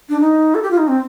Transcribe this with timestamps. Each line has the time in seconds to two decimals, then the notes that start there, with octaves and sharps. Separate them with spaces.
0.10 D4
0.21 D#4
0.55 A4
0.63 G4
0.71 F4
0.78 D#4
0.88 C4